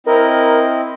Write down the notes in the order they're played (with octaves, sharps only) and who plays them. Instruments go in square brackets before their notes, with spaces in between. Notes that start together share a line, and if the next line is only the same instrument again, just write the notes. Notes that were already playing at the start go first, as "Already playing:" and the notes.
[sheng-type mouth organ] C4 E4 D#5 [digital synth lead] A#4